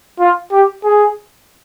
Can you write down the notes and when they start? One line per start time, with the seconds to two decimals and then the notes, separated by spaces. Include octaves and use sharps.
0.19 F4
0.52 G4
0.84 G#4